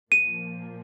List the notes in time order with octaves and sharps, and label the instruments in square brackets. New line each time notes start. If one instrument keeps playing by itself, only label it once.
[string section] A#2 F3 A#3 [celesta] D#7